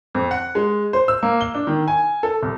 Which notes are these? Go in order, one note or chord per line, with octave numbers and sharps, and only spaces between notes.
F2
F#5
G#3
C5
E6
A#3
G7
D4
D#3
G#5
A4
C2